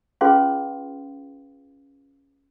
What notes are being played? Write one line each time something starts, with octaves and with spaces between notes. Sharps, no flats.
C#4 F4 G#4 B4 F5 C6